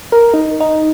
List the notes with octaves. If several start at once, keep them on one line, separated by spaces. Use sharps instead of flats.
A#4
D#4
D#4